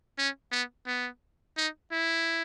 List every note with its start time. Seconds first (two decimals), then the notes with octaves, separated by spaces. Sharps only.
0.18 C#4
0.52 B3
0.87 B3
1.57 D#4
1.92 E4